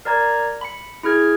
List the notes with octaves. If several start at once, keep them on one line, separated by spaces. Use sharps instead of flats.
A#4 D5 A#5 G#6
B5 C#7
E4 G#4 F6 G#6